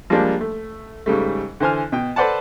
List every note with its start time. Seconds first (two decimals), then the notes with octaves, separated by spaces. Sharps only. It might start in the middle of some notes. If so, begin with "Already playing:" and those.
0.10 F3 G3 G#3 A#3 D4
0.41 A3
1.06 G#2 C#3 G3 A3
1.60 D3 E3 C5 G#5 F6
1.92 B2 G5
2.16 A4 B4 C5 D5 F#5 A5